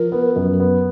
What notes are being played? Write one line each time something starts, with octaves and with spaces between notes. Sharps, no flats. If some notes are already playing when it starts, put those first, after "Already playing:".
Already playing: F3 A#4
B3
F#2
B3